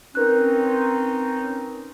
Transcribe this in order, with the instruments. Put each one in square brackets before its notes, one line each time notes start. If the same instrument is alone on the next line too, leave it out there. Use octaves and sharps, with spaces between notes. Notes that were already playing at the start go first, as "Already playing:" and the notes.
[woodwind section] C4 C#4 D#4 [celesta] A#4 B4 F#6